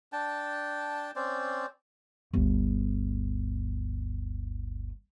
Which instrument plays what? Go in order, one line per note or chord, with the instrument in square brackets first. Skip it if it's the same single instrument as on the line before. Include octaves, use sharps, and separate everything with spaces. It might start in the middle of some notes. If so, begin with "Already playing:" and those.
[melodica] D4 G5 A5
C4 C#4 C5 D5
[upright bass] G1 D2